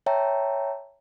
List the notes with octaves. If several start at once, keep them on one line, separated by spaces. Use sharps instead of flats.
C#5 E5 G5 A5 A#5